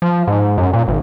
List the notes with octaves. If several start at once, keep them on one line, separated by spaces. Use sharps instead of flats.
F3
G#2
F#2
A#2
G#1